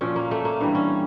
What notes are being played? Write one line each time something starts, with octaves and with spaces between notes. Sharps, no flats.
A#2 F3 C#4
A#3
A3
A#3
G2 E3 G3
C#4